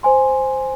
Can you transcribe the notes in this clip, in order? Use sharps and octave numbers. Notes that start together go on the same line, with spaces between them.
C5 G#5 C6